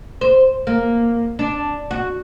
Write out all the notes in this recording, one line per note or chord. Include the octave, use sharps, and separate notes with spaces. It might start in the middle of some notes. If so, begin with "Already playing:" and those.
C5
A#3
D4
F#4